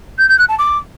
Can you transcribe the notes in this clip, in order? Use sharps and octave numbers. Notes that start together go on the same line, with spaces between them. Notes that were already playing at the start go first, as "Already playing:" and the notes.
G6
G6
F#6
A5
D6